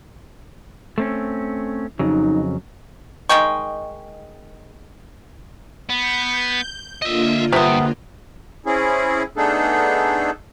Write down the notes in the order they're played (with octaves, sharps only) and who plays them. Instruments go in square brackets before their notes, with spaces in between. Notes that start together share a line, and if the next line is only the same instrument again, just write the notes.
[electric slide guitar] A3 C4 C#4
[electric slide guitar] F2 C#3 F#3 [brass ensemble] D#4
[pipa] D#3 G#3 G5 C#6
[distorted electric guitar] B3 [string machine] G6
[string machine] D3 A#3 F4 [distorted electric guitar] D#5 E5
[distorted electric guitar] G2 [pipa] C3 B3
[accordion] C4 C#4 E4 G#4
A3 B3 D4 D#4 G#4 A4